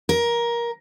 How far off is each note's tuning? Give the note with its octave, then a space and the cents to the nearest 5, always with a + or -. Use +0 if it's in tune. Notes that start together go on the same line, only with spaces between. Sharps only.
A#4 +15